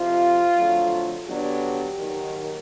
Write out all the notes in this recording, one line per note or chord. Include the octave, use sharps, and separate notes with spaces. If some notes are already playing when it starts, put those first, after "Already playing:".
Already playing: F2 C3 F3 F4
F2 D3 F#3 A3
D3 F#3 B3 D4 G4
D#2 D#3 F#3